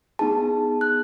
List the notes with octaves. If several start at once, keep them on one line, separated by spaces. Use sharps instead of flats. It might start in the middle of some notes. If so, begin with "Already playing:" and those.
B3 D#4 G#4 A5
F#6